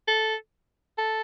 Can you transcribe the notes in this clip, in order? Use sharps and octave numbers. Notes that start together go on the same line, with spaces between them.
A4
A4